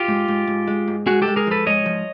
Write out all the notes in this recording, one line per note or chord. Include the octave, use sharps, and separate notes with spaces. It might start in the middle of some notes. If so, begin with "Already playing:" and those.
Already playing: F4 G4
G#2
G#2
G#2
G#3
G#2
G#3 F#4 G#4
G4 A4
G#3
G#4 A#4
F3 A4 B4
G#2 C#5 D#5
F3